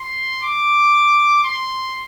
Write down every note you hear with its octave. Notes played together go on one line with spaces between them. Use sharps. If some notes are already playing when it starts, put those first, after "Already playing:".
Already playing: C6
D6
C6